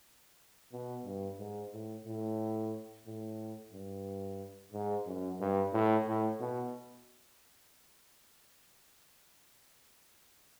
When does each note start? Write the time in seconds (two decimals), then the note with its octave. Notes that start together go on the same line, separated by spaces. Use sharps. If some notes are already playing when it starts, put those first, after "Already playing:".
0.72 B2
1.05 G2
1.39 G#2
1.73 A2
2.05 A2
3.06 A2
3.73 G2
4.72 G#2
5.07 F#2
5.40 G2
5.73 A2
6.07 A2
6.40 B2